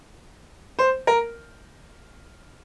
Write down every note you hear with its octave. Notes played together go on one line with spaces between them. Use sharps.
C5
A#4